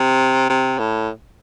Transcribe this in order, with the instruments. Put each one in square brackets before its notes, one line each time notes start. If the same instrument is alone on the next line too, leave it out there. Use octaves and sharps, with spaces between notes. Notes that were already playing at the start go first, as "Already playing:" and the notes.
Already playing: [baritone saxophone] C3
C3
A2